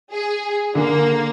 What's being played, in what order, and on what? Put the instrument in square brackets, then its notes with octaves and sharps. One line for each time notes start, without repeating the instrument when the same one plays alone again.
[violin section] G#4
[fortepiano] D3 [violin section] A#3